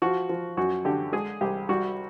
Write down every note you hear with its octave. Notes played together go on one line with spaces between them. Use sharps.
F3 F#4
F3
F#2 F#4
D3 G4
G#3 G#4
C2 G4
G3 F#4